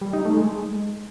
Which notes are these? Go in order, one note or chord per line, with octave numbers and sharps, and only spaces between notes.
G3
D#4
A3
G#3